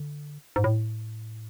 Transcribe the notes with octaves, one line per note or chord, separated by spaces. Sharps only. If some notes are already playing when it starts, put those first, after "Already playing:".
Already playing: D3
G#2
A2